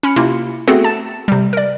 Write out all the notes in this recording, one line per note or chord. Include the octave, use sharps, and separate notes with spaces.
C#4 B5 F6 C#7
C3 A#3 E4 F4
A3 B3 C4 F#4 G#4 A4
A5 A6 E7
C3 G3
A#4 D5